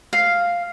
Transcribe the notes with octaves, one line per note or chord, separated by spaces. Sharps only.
F5